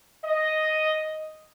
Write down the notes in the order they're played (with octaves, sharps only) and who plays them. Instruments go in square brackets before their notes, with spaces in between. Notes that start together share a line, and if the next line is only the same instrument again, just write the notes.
[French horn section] D#5